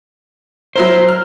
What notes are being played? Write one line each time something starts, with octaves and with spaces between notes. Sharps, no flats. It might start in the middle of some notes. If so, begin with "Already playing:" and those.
F#3 E4 A#4 C5
F6